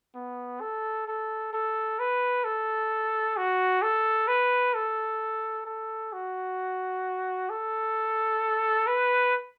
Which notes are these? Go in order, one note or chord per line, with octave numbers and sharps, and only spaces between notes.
B3
A4
A4
A4
B4
A4
F#4
A4
B4
A4
A4
F#4
A4
B4